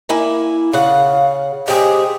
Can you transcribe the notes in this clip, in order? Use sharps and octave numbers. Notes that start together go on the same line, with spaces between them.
A#3 E4 G#5
C#3 F5 F#5
G#3 C4 G4 G#4